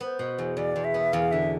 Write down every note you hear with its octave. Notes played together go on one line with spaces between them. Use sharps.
B3 C5
B2
E2
E2 D5
E2
E5
B3
E2 F5
D3 E5